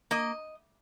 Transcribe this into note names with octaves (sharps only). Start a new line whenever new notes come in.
A#3 D#5